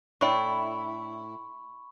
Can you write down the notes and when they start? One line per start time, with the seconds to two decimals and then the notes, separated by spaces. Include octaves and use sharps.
0.21 A2 D4 E4 C#5 G5 B5 C#6